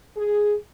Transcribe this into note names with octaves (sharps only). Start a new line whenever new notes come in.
G#4